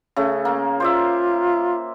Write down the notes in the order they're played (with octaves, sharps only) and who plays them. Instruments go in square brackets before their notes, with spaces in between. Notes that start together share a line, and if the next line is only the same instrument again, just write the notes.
[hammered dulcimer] C#3 A3
A#3
[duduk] F4 [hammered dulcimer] C5 D5 E5